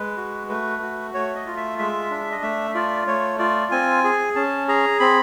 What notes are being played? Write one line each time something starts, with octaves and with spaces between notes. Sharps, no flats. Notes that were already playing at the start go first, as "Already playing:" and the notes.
Already playing: G#3 B4
F#4
A3 B4
F#4
A3 C#5
D#5
F4
E5
G#3 E5
D4
D#5
A3 E5
F4 D5
A3 C#5
F4 D5
C4 G#5
G#4
C#4 A5
G#4 A#5
C4 B5